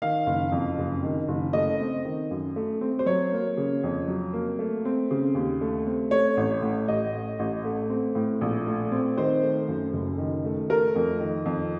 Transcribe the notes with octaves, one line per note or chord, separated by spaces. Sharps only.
D#3 F5
F#1
F2
F#1
D#3
F#1
A3 D#5
C4
D#3
F#2
A3
C4
C5
F#3 C#5
A#3
C#3
F2
F#3
A#3
A3
C4
C#3
D#2
A3
C4
A3 C#5
A1
A2
A1 D#5
A3
A1
A3
C4
A2
A#1
A3
C4
D#3 C5
A3
F#2
F#1
D#3
A3
A3 A#4
F2
D#3
F2